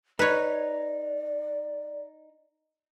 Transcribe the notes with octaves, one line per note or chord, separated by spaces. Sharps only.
D#4 B4 C#5 D5